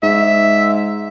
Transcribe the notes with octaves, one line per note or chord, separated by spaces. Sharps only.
G#2 E5